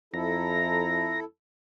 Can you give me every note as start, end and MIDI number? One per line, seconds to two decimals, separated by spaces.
0.14 1.23 41
0.14 1.24 64
0.14 1.24 69
0.14 1.20 82